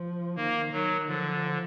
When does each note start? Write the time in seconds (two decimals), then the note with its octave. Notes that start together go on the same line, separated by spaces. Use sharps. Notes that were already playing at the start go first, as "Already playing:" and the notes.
Already playing: F3
0.36 D#3 A#3
0.72 D#3 F#3
1.08 D3 F3